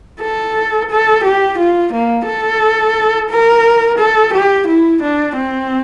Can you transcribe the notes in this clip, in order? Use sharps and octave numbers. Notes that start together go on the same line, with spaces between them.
A4
A4
G4
F4
A#3
A4
A#4
A4
G4
E4
D4
C4